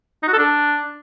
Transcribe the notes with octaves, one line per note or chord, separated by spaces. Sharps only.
D#4
F#4
A4
D4